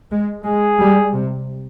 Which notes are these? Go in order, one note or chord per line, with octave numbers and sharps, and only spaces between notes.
G#3
G#3 G#4
G3
C3